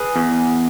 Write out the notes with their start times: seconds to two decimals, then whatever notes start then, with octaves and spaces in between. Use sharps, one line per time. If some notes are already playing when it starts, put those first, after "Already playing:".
Already playing: G#4 B4
0.16 E2